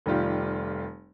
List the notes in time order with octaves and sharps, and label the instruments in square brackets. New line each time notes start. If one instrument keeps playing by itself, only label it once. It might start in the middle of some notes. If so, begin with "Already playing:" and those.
[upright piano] F1 D#3 G3 F4 G4